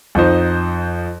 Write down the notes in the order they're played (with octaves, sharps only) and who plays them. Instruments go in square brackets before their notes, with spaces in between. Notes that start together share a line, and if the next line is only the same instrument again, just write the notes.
[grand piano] F2 F3 D#4 C5